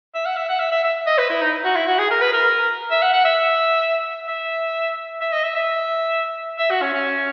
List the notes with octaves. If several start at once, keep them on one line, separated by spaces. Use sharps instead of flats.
E5
F#5
E5
F#5
E5
E5
E5
D#5
B4
E4
D#4
F#4
E4
F#4
G#4
A#4
B4
A#4
E5
F#5
F#5
E5
E5
E5
D#5
E5
E5
E5
F#4
C#4
C#4